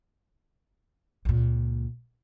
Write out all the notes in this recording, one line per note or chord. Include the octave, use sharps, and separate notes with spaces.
C#2 A#2